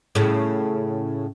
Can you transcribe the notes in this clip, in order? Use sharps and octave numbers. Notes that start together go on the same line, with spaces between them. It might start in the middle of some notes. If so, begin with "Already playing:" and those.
A2 C#3